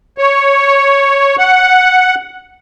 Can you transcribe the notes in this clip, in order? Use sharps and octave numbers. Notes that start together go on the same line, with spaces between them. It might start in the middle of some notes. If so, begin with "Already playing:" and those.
C#5
F#5